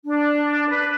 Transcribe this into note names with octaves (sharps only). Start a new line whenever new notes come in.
D4
B4